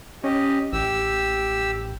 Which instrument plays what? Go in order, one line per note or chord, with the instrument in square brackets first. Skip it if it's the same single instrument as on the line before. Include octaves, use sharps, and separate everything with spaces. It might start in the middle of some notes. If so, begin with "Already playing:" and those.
[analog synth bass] C#4 [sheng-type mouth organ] G4 D#5
[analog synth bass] A1 [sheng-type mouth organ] G4 E6